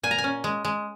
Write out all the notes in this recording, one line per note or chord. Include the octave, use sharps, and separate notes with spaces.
A#2 G#5
A#5
G#5
C#4
G#3
G#3